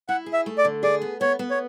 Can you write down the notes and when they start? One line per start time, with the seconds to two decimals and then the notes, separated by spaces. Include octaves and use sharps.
0.09 E4 F#5
0.26 G#4
0.33 E5
0.46 A3
0.58 D5
0.65 D3
0.83 G#4 D5
1.02 B3
1.21 B3 C#5
1.39 B3
1.51 C#5